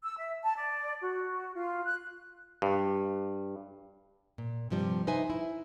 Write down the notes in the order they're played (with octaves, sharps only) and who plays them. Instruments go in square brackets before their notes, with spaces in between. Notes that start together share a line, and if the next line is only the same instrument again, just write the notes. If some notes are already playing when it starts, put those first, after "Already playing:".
[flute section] E6
E5
A5
D5
F#4
F4
F#6
[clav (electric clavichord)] G2
[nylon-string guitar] A#2
G2 C3 F3 G3
D#4 B4 C5 E5 G#5
E4